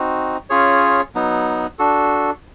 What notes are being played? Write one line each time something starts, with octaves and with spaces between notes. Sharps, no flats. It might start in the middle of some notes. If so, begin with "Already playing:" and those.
Already playing: C4 D#4 F#4
C#4 F4 G#4 C#5
F#3 B3 D#4
D4 F#4 A4